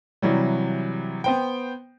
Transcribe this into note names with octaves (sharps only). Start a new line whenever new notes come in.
C3 E3 F#3 G3
B3 C5 G5